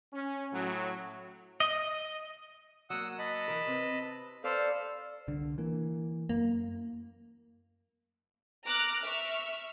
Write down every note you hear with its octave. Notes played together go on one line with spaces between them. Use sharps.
C#4
A2 F#3
D#5
F#3 A#3 F#5 D#6 E6
D#5 A5 B5
E3 A#4
C3 C4 B4
A4 B4 C5 D5 F5
C2 D3
E3 A#3
F#2 A#3
A#5 D6 F6 F#6
E5 C#6 F6